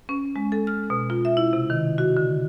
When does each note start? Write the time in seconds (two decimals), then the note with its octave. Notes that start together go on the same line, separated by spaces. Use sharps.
0.09 C#4
0.36 G#3
0.52 A4
0.67 F6
0.90 B2
1.10 F4
1.25 E5
1.37 E4
1.53 C3
1.70 D#3
1.98 F#4
2.17 D3